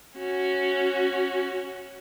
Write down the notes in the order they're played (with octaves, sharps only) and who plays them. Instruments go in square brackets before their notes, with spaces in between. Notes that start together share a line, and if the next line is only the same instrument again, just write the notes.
[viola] C#4 F#4